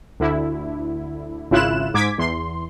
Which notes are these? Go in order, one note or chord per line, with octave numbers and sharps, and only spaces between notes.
D2 D3 E4
G#1 C#3 E4 F4 F#6 E7
G#2 D6 G#6 B6
E2 C6